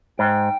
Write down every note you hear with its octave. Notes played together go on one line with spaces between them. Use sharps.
G#2 G5